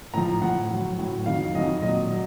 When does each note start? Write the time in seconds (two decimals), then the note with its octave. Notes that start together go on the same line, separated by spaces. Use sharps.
0.14 A2 F3 A#5
0.41 A2 F3 F#5
0.70 A2 F#3
0.98 A2 F#3
1.26 F2 D#3 F#3 F5
1.54 F2 D#3 F#3 D#5
1.82 A#2 F#3 D#5
2.11 F#3